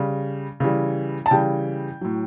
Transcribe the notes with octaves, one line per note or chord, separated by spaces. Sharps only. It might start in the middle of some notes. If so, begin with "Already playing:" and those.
Already playing: C#3 G3
C#3 E3 G3
A5
C#3 E3 G3 G5
A2 F#3